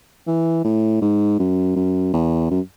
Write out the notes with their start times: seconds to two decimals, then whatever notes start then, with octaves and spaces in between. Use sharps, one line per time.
0.27 E3
0.65 A2
1.02 G#2
1.39 F#2
1.76 F#2
2.13 E2
2.51 F#2